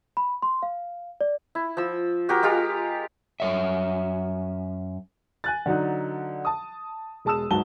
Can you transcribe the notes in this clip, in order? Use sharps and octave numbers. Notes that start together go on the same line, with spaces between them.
B5
C6
F5
D5
E4
F3 E6
F#4 G4 A#4
G#3 F4 G4 F5
F#2 C#5 E5
G#5 F#6 A6
D3 F#3 D#4
A5 D#6
E1 G#3 A5 D#6 E6 E7
C#2 G#2 F#3 A5 G7